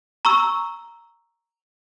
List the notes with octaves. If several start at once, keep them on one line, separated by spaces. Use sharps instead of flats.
A#5 C#6 E6